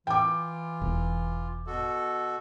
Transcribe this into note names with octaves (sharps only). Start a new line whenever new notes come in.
E3 F4 G5 D6
E1
B2 F#4 A4